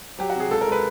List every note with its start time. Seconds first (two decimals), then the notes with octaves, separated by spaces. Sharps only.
0.19 F#3 G4
0.30 F#4
0.35 C3 G#4
0.50 C#2 A4
0.61 A#4
0.67 G#3 B4